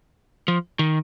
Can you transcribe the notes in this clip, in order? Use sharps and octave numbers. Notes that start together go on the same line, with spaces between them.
F3
D#3